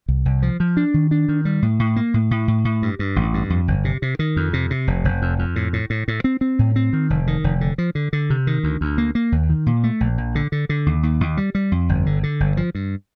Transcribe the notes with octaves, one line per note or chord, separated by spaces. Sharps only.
C2
C2
F3
F3
D4
D#3
D4
D#3
G3
A2
A2
A#3
A2
A2
A2
A2
G2
G2
A1
G2
F2
G1
C3
C3
D#3
F2
C3
C3
F1
F1
F2
F2
A2
A2
A2
A2
C4
C4
A2
C4
D#3
F1
D#3
F1
D3
F3
D3
D3
C3
D#3
D2
D2
A#3
A#3
D#2
D#3
A#2
A3
A#1
A#1
D3
D3
D3
D#2
D#2
D#2
G3
G3
F2
G1
D3
D3
G1
F3
G2